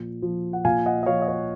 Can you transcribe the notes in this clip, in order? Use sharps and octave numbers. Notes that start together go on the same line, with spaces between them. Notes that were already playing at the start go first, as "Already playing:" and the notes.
Already playing: A#2 F3
F3
F#5
A#2 F5 G#5
D#5 F#5
D#5
F3 C#5 F5
D#5
C#5